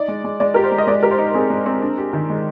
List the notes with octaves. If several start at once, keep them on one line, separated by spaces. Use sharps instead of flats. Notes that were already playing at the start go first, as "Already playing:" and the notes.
Already playing: D#4 D5
G#3
G#3
G#3 D5
G4 A#4
C5
G#3
D#5
G#3 D5
G4 A#4
C5
D#4
C4 G#4
G#3
C4
D4
G4
D#3
G#3